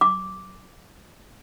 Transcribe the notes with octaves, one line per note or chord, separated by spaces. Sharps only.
D6